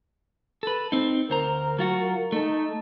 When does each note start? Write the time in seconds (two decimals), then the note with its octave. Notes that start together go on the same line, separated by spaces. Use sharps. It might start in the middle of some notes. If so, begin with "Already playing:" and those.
0.63 A4 B4
0.92 C4 D#4
1.30 D2 A#4 C5 A#5
1.79 F#3 F4 F#4
2.32 A3 D#4 A4